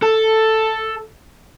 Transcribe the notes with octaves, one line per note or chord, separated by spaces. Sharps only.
A4